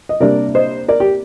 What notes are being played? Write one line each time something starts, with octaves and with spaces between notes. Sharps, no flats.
D#5
C3 G3 A#3 D4 A#4 D5
C5 D#5
A#4 D5
G4